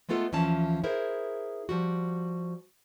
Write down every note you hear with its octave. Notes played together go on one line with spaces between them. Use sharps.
G#3 A3 B3 F4 A4
D2 E3 F3 C#4 A5
E4 G#4 A#4 C5
F3 G3 F#4